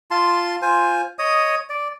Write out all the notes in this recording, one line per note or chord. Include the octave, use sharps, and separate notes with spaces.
F4 A5 C6
F4 C5 G#5
C#5 D#5 D#6
D5